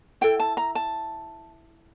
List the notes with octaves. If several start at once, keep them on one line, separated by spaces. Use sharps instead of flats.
E4 A4 G5
A5
A#5
A5